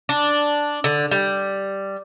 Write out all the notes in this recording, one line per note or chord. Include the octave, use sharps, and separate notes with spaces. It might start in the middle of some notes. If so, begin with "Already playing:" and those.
D4
D3
G3